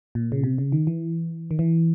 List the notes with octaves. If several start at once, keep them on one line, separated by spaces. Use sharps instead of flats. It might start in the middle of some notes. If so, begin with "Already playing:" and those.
A#2
C#3
C3
C#3
D#3
E3
D#3
E3